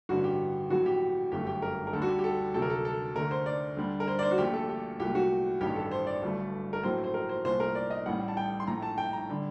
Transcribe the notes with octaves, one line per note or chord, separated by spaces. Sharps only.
A1 G2 D3 F#4
G4
A#1 A2 F#3 F#4
G4
G1 F#2 F#3 A3 G4
G4
A#4
A#4
D2 D3 G3 A4
F#4
G4
G4
A4
D2 C3 F#3 A4
A#4
A4
A4
D2 D3 A3 A#4
C5
D5
D2 D3 G3
A#4
C5
D5
C5
F#4
A#1 A#2 A3 G4
A4
G4
C2 A#2 F#3 A3 G4
F#4
A1 G2 D#3 G4
A4
C5
D5
G1 G2 F#3 A3
A#4
A#1 A2 F#3 A3 C5
C5
A#4
C5
C2 A#2 A3 C5
A#4
D5
D#5
A1 A2 G3 F#5
A5
G5
C6
A#1 A2 A3 A#5
A5
G5
A#5
D3 G3